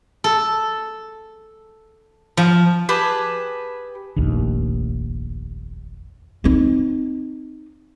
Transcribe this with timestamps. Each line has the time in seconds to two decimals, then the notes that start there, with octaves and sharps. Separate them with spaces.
0.24 A4
2.37 F3
2.89 G4 G#4 B4 A5
4.16 F1 A#1 D#2
6.44 C4 D#4